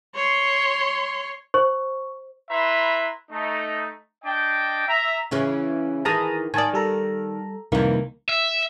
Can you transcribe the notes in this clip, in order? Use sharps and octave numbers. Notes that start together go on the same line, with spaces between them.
C#5 C6
C5 C#6
E4 B4 E5 A#5 C6
A3 D#4
D4 D#5 G5
E5 A#5
C#3 E3 C#4
D#3 E3 G#4 A5 A#5 D#6
D#3 D5 G#5 A5 D#6
G3 A4 A#5
C2 F2 D#3 E3 A#3
E5